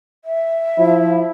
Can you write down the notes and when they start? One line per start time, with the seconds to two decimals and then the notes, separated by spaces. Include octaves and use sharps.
0.25 E5
0.78 F3 E4